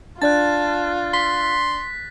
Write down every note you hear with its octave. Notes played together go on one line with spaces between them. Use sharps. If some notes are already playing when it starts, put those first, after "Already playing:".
D4 F4 D5 A5 F#6 A6
C6 B6